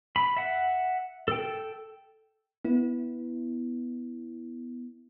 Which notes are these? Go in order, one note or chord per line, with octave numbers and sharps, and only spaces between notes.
B5
E5 F#5
A4 G5
B3 E4